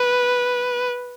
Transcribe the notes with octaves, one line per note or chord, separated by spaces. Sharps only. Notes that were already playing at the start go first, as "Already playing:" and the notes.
Already playing: B4